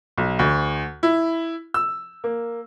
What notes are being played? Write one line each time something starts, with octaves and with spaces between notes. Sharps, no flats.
B1
D2
E4
E6
A#3